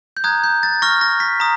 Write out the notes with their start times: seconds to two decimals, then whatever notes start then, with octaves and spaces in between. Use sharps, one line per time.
0.17 G6
0.24 A#5 D#6 F#6 G#6
0.44 G6
0.63 A6
0.82 C#6 F6 A#6
1.01 A#6
1.20 B6
1.40 A#5 D#6